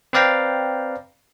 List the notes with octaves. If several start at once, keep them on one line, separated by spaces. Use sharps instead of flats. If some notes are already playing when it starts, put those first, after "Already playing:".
C4 B4 D5 F5 G5 A#5